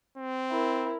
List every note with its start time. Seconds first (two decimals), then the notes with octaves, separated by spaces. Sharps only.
0.17 C4
0.51 E4 A#4